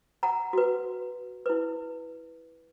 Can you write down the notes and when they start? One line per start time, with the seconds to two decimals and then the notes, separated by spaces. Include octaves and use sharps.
0.23 F#5 A#5
0.53 F#4 B4
1.46 E4 B4